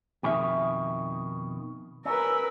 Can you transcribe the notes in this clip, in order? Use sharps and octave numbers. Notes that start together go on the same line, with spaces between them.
F2 B2 D#3 E5 G#5
C#4 A#4 B4 E6